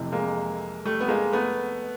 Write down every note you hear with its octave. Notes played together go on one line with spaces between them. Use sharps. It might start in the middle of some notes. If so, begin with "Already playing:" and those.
Already playing: F1 F2 C3 E3
G#3 A#3
G3 A3
B3
G#3 A#3
A3 B3